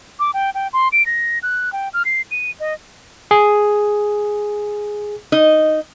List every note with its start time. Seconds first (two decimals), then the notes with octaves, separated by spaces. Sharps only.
0.19 D6
0.34 G5
0.54 G5
0.73 C6
0.92 D7
1.06 A#6
1.43 F#6
1.73 G5
1.93 F6
2.05 C7
2.31 D#7
2.60 D#5
3.31 G#4
5.32 D#4 D#5